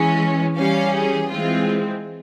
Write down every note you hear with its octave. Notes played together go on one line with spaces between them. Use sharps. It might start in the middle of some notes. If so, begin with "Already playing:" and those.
Already playing: E3 G#3 C#4
E3 G3 C#4 F5
G#4
E3 G#3 C4 F4